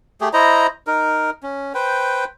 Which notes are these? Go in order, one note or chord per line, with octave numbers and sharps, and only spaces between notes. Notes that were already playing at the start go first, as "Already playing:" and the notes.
A3 G4 G#4
E4 C5 D#5 A#5
D#4 A#4
C#4
B4 C5 G5